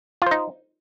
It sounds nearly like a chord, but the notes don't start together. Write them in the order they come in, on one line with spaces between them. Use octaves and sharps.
F4 C5 D#4